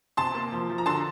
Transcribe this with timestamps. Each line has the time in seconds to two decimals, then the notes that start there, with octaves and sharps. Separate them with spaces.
0.17 C3 A5 C6
0.35 A#3
0.52 F3
0.70 F3
0.78 A#5
0.86 D3 A5 C6